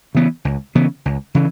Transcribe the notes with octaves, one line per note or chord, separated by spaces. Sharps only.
C#3 E3 B3
C#2
C#3 E3 B3
C#2
C#3 E3